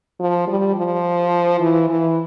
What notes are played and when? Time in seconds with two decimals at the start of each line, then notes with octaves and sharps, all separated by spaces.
0.20 F3
0.47 G3
0.76 F3
1.60 E3
1.89 E3